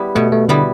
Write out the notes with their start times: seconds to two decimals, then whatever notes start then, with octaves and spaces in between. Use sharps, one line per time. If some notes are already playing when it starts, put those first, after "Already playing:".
Already playing: G3 B3 E4
0.15 B2 A3
0.32 A3
0.49 D3 G3 B3 E4